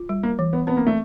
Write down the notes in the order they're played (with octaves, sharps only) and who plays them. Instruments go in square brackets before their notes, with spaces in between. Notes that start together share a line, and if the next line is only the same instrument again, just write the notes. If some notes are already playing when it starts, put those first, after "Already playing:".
Already playing: [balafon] F4
G3
[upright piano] A#3
[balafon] E3
[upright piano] B3
[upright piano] B3 [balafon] C4
[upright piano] A#3
A3